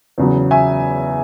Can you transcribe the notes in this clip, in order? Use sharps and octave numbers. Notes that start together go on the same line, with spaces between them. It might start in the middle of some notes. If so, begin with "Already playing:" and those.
E2 C#3 F#3
E5 G#5